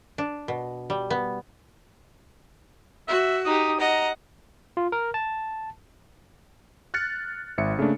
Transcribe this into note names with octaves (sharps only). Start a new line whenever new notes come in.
D4
B2
G3
B3
F#4 E5
D#4 G4 D#6
D#5 F#5 A#5
F4
A#4
A5
F6 F#6 A6 C#7
G#1 E5 C#7
C#3 A3 A#3 D4